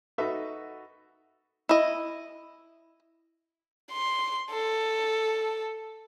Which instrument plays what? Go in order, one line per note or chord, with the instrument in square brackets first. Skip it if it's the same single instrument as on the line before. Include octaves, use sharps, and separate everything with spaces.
[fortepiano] D#4 F#4 A4 B4 E5
[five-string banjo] E4 D#5
[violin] C6
A4